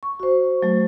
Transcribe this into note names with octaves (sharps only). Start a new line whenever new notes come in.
C#6
F#4 C5
F#3 A3